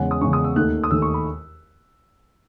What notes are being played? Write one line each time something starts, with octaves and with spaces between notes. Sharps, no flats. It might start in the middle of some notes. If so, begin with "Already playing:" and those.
Already playing: E2 C#3 G#3 C#4 F#5
D#6
E2 C#3 G#3 C#4 C#6
D#6
E6
D#2 D#3 A3 F#6
D#6
D#2 D#3 A3 E6
C#6
B5